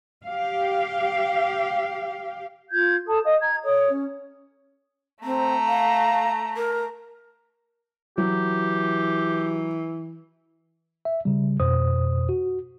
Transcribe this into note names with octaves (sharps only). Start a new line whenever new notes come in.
G4 F5
F4 G6 G#6
A4 A5 D#6
D#5 F5 D#6
A#5 G#6
A4 C#5 D#6
C#4
A3 C4 A#5
F5
A#4
E3 F#3 G4
E5
C#3 G3
F2 B2 C5 D#6
F#4